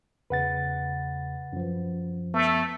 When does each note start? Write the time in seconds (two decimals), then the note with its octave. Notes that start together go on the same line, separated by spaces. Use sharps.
0.30 E2 C#3 B4 F#5 A6
1.53 F#2 F3
2.34 A3 B3